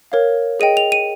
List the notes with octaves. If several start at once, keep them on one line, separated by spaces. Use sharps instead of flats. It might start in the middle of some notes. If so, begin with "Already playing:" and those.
A#4 C#5 F5
G#4 D#5 G5 D#7
F7
D#7